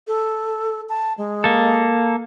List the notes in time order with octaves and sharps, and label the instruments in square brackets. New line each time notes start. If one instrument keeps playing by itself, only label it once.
[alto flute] A4
A5
G#3
[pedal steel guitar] A#3 A4